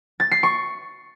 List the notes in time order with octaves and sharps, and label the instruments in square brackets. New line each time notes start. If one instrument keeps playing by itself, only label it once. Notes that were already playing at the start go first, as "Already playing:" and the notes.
[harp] A6
C7
C#6